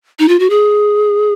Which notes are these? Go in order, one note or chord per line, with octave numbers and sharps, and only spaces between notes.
D#4
F4
F#4
G#4